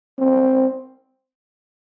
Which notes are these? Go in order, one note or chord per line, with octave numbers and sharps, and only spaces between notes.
C4